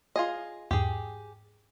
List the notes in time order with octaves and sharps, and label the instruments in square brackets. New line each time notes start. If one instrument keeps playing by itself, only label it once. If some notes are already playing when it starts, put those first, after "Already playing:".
[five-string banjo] F4 G#4 D#5
[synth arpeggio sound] E2 G#2 [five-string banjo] G4 G#4